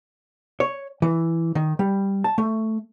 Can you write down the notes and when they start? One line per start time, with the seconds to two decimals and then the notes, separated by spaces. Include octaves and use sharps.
0.60 C#5
1.02 E3
1.55 D#3
1.79 G3
2.24 A5
2.38 A3